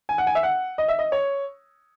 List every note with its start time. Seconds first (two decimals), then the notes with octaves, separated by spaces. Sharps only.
0.09 G#5
0.18 F#5
0.27 G#5
0.35 E5
0.43 F#5
0.78 D#5
0.88 E5
0.99 D#5
1.12 C#5